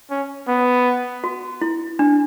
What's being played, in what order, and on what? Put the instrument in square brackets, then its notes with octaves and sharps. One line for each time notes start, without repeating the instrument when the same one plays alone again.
[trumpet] C#4
B3
[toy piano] F#4
E4
D4